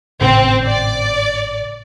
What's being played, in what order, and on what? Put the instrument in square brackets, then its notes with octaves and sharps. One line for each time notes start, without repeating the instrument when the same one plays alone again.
[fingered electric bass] G#1 A2 C#3 [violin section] C4
[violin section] D5